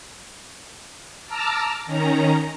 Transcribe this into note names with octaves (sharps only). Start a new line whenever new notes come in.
A5 A#5 D6 E6 F6
D#3 C#4 A#5